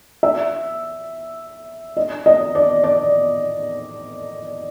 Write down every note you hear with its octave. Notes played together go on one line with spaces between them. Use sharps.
E5
D#5
D#5
D5
D5